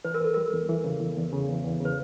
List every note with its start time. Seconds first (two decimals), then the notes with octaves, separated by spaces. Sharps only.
0.05 E3 B4
0.14 A#4
0.21 E2 A4
0.34 G3 A#4
0.53 E2
0.69 E3
0.84 C#3
1.00 E2
1.17 E2
1.32 C#3
1.48 E2
1.65 E2
1.80 C#3 B4